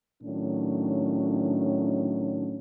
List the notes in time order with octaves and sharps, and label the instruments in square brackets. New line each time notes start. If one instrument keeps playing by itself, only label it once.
[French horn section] A2 D#3 F#3 C#4 D4